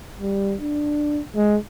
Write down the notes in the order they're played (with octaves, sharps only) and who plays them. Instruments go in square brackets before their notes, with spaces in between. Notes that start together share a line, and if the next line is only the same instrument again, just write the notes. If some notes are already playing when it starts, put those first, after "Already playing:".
[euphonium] G3
D4
G#3